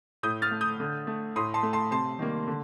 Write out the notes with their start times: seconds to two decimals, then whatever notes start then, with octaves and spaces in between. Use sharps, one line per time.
0.23 A2 D#6 G6
0.42 F6 A6
0.51 A3
0.61 D#6 G6
0.80 D3
1.07 A3
1.36 A2 C6 D#6
1.54 A5 C6
1.63 A3
1.73 A5 C6
1.91 C3 A5 C6
2.19 D#3 G3 A#3
2.48 D3